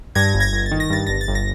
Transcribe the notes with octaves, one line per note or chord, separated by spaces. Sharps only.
G2 G#6 A#6
G1
G#6 A#6
G1
A6
D#3
A#6
G2 A6
G1 A#6
A6
G1
A#6